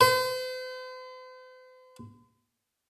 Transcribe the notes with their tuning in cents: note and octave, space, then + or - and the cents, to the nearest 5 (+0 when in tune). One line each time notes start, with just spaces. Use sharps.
C5 -40